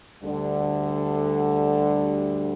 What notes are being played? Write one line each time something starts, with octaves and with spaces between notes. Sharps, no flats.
D2 D3 G3